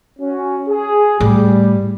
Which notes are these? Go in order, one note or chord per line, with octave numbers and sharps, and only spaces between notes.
C#4 F#4
G#4
A2 G3